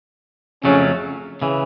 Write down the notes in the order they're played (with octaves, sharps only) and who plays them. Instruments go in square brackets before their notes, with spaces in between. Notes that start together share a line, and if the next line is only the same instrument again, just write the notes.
[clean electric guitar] F2 C#3 F#3 A3 [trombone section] C#4
[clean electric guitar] C#3 E3